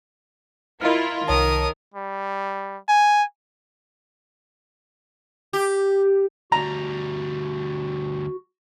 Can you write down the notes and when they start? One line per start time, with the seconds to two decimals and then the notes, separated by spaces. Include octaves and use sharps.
0.81 E4 F4 A#4 D#5 F6
1.28 C2 D#3 A#4 C#5 A5 D#6
1.94 G3
2.88 G#5
5.53 G4
6.52 D2 G3 F#4 A#5